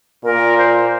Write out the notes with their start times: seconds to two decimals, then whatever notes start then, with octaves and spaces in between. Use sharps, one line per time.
0.24 A#2 A#4
0.58 C5